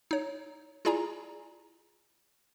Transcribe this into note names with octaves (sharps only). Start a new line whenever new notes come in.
D#4 C#5
E4 F4 G#4 D5 G#5 A#5